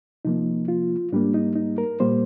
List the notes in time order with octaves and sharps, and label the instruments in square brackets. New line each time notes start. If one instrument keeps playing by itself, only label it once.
[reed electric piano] C3 F3 A#3 D#4
F4
G#2 G3 A#3 D4
D#4
D#4
A#4
A#2 G3 A#3 C5